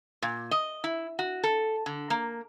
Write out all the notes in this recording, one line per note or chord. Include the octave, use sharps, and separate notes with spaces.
A#2
D#5
E4
F#4
A4
D3
A#3